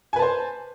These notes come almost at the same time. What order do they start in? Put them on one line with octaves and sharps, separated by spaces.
G#5 B4 A5 C5